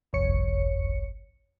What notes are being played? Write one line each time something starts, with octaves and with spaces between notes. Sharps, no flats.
G1 C2 F2 C#5 C#7